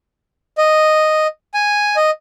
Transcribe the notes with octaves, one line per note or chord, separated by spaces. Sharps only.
D#5
G#5
D#5